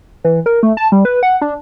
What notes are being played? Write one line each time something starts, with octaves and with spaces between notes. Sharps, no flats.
E3
A#4
A3
A5
G3
B4
F#5
D4